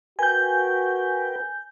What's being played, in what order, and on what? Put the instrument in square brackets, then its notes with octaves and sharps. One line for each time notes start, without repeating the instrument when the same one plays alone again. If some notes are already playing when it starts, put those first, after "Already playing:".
[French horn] F#4 [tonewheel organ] A#4 B4 G5 [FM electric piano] G#5 G6